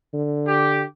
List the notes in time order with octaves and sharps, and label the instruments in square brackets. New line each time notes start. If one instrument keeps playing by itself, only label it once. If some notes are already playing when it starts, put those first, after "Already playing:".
[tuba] D3
[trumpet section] G4